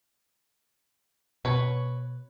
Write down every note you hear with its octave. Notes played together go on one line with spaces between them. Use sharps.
B2 B4 C#5